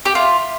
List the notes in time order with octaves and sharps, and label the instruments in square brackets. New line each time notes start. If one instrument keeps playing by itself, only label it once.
[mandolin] G4
[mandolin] F4 [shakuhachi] E5